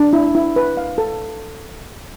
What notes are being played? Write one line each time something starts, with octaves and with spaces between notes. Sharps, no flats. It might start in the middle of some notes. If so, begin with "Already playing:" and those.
Already playing: D4
E4
E4
B4
F5
A4